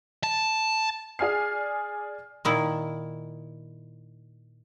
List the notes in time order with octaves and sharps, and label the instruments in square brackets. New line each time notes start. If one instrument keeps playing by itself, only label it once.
[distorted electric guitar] A5
[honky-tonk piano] G#4 D5 G#5 F6 C7
[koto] A#2 D#3 E4